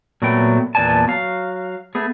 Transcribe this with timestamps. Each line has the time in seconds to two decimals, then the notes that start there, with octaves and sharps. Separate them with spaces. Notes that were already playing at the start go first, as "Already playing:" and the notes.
0.22 A#2 F#3 A3 B3 G5
0.75 E2 A#2 B3 D5 G#5 A5
1.08 F#3 F5
1.95 A3 B3 G#4